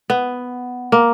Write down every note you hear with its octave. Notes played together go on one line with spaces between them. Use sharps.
B3
A#3